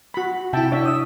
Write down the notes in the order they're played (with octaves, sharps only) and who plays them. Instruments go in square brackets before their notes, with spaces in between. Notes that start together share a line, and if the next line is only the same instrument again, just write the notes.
[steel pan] F#4 B5
[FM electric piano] C3 E4 [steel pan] E5 G5 A5
[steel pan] D4 C#5 E5
[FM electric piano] D#6 E6